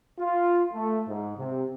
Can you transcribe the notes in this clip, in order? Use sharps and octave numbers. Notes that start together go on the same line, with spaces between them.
F4
A3
G#2
C3